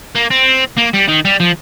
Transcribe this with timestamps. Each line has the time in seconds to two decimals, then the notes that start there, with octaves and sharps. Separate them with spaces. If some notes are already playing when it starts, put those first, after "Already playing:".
0.15 A#3
0.31 C4
0.78 A#3
0.94 G3
1.08 D#3
1.25 G3
1.40 F3